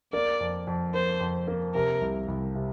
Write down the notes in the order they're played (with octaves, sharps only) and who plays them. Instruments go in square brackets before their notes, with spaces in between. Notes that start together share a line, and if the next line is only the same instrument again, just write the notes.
[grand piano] A#3 [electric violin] D5
[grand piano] F2
F2
[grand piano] A#3 [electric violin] C5
[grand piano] F2
A#3
[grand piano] C3 [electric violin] A#4
[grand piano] C2
C2
C3